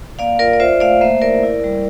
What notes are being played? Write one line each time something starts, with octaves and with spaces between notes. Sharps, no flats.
A#3 D5 F5
F4 A#4 D5
D5
F4 C5 E5
A3 D5 F5
A#3 C5 E5
E4 A#4 D5
E4
G3